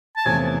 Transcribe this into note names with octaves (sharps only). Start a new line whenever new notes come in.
A5
E2 C3 F3 A3 C#4 G#5